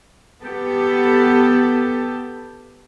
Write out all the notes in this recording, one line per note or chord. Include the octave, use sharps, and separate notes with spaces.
B3 G4 A4